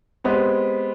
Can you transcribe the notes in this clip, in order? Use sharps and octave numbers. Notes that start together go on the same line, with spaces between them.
G#3 B3 C4 G4